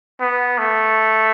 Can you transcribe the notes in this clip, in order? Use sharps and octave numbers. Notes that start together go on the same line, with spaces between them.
B3
A3